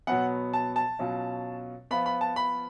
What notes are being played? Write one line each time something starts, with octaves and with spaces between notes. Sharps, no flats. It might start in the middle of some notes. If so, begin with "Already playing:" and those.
B2 F#3 B3 F#5
A5
A5
B2 F#3 C#4 F4
F3 B3 F4 B5
B5
A5
B5